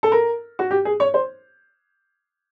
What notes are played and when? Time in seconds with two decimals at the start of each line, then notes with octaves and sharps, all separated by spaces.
0.03 A4
0.12 A#4
0.59 F#4
0.71 G4
0.85 G#4
1.00 C#5
1.14 C5